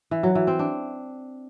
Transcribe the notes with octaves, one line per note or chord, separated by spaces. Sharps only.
E3
F#3
E3
C4
D4